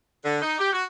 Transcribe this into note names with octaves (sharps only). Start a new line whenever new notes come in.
D3
D#4
G4
F#4